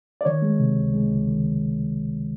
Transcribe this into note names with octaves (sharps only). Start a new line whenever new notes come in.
D5
D#3 C#5
G#3
C3
C#2
G#3
C#2
D#3